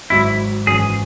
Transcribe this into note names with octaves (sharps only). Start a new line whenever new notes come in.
G#1 G#2 F#3 E4
G#1 F#2 E3 G#4